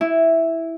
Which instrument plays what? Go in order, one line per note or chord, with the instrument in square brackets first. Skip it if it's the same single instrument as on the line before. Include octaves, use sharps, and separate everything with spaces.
[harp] E4